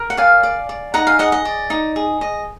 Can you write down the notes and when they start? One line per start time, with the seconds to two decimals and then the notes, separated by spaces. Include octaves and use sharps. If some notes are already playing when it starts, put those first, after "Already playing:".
Already playing: A#4
0.10 F#5
0.17 D5 F5 G#5
0.43 D5
0.69 D5
0.94 D#4 F#5 A#5
1.07 F5 G#5
1.19 G#4 D#5 F#5
1.32 D#5
1.45 D5
1.70 D#4
1.96 G#4
2.21 D#5